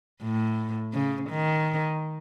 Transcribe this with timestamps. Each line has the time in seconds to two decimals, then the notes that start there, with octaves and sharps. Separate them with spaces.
0.22 A2
0.93 C#3
1.30 D#3